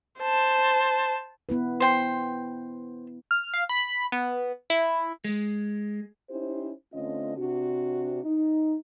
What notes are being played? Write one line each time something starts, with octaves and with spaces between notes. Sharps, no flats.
C5 A5
B3 E4 B4
C5 G5 C6
F6
F5
B5
B3
E4
G#3
C#4 D#4 E4 G4 C5
D3 A3 C4 C#4 F4 D#5
C3 D4 F#4
D#4